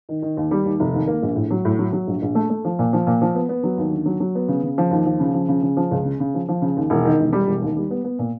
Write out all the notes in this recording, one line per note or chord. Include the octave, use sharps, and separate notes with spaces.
D#3
D#3
D#2
G3
D#2
F1
D#2
A#3
A#1
A2
F#3
A2
F#3
F#3
A#1
A#1
A3
A3
F3
A#2
F3
A#2
F3
B3
B3
F#3
D#2
D3
F#3
F#3
B3
C#3
C#3
F3
D#2
F3
C#3
F3
C#3
C#3
F3
C#2
C#3
C#3
F3
F3
C#3
D#2
E1
D#3
E1
G3
E1
D#2
G3
B3
B3
A#2